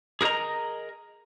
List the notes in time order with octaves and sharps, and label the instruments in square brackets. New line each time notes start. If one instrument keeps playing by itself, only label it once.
[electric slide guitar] G#4 A#4 C5 D#5 A#5